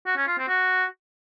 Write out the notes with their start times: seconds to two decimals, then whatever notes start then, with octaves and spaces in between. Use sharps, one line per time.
0.06 F#4
0.16 C#4
0.27 F4
0.38 C4
0.48 F#4